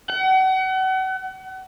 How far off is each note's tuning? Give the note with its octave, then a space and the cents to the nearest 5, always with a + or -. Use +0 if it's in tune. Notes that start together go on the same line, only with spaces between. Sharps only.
F#5 +35